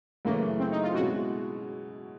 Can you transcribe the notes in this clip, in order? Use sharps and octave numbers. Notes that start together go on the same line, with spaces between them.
F#2 C#3 E3 A3 A#3 C#4
C4
D#4
F4
B2 G#3 C#4 E4 F#4